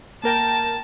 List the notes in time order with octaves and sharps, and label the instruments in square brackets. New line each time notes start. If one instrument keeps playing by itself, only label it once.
[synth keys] A#3 A#4 G5 [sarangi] A5